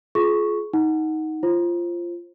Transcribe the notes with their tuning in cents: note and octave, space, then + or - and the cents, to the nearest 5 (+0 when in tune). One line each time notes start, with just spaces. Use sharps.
F4 +0 G#4 +30 C#6 +0
D#4 +15 F#5 +0
F4 -15 C5 +20